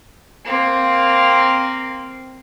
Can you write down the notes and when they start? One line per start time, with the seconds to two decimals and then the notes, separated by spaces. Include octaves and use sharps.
0.44 A#3 C4